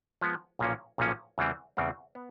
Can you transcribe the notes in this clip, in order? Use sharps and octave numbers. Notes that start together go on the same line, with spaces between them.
F3 G#3 B3
B1 A#2 F3 A#3 C#4
B1 A#2 F3 A#3 C#4
E2 C#3 E3 G3 C4
E2 C#3 E3 G3 C4
B3